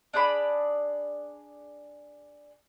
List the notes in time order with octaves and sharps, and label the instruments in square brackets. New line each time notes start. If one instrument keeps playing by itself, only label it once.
[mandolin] D4 G#4 D5 B5